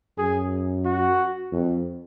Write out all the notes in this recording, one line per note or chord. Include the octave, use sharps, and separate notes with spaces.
F#2 G#4
F#4
F2